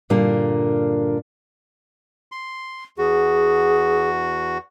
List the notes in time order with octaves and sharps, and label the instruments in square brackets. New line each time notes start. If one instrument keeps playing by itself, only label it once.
[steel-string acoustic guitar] G2 A#2 D3 A#3 D4
[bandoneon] C6
[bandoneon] E2 F#4 [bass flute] G#4